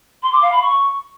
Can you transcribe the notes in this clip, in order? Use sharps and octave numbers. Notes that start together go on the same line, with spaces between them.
C6
D6
F5
B5
C#6